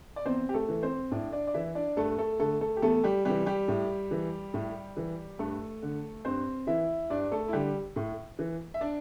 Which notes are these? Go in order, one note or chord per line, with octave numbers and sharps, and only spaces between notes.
D5
E2 C4 C5
G4
A3 A4
E3
C4 C5
A2 D4 D5
D4 D5
D5
E3 E4 E5
D4 D5
G2 A3 A4
A3 A4
D3 A3 A4
A3 A4
G4
E2 A3 A4
G3 G4
C3 E3 G3 G4
G3 G4
A2
E3
A2
E3
G2 A3 A4
D3
G2 C4 C5
E3 E4 E5
G2 D4 D5
A3 A4
E4
D3 G3 G4
A2
E3
E5
D4 D5